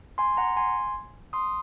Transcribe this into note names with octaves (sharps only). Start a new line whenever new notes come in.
G#5 C6
F#5 A#5
G#5 C6
C6 D#6